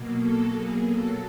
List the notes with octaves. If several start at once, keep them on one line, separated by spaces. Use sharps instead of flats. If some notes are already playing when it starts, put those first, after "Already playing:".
Already playing: B2 F#3 A#3
A4
G#4
A4